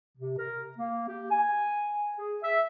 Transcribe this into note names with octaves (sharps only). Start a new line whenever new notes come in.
C3
A#4
A#3
G4
G#5
G#4
E5